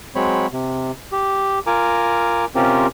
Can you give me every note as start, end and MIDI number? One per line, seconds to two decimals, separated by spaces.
0.15 0.47 54
0.15 0.47 56
0.15 0.47 60
0.15 0.47 73
0.15 0.47 83
0.53 0.91 48
1.12 1.59 67
1.67 2.45 65
1.67 2.45 70
1.67 2.45 80
1.67 2.45 82
1.67 2.45 86
2.55 2.87 48
2.55 2.87 60
2.55 2.87 61
2.55 2.87 65
2.55 2.87 67
2.55 2.87 70